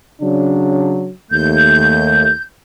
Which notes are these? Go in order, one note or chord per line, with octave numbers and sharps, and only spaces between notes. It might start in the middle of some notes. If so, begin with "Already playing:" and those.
C#3 F#3 D4
D#2 A3 G6